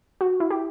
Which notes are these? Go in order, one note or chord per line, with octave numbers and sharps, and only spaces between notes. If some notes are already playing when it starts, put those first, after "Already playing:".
F#4
E4
G4